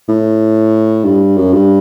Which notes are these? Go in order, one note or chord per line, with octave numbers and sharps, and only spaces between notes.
A2
G2
F#2
G2